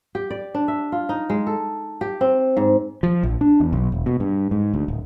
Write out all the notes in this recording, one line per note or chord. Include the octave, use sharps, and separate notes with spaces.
G4
D5
D4
E5
F4
D#4
G#3
A4
G4
C4
G#2
F3
A#1
D4
E2
B1
E1
B2
G2
G#2
D2
D1